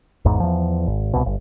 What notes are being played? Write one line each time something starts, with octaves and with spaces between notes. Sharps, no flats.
G#1 E2 G#2
E2 F3
G#1
C2 B2
G1